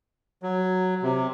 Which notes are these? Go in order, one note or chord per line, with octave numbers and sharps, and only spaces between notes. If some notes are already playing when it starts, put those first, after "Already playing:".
F#3
C3